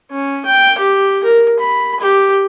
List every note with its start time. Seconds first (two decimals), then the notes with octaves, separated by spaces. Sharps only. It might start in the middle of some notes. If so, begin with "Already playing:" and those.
0.11 C#4
0.45 G5
0.78 G4
1.24 A#4
1.59 B5
2.00 G4